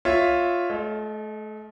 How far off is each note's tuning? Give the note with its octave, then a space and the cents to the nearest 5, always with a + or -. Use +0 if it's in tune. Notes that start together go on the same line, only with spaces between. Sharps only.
F4 +5 C#5 +0 E5 +0
A3 -35 D#5 +5